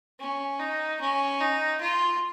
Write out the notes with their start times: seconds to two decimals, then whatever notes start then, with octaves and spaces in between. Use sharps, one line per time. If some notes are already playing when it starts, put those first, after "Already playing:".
0.20 C#4
0.60 D#4
1.01 C#4
1.40 D#4
1.81 F4